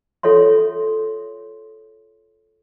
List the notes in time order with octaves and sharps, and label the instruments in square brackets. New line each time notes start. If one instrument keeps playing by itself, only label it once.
[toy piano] F4 A4 C#5 E5 C6